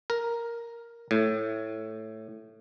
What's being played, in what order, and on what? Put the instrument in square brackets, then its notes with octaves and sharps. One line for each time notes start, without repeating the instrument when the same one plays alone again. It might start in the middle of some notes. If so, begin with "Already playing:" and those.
[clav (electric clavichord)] A#4
A2